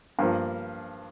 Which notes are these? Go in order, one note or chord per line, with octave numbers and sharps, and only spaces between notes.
G2 F3 A#3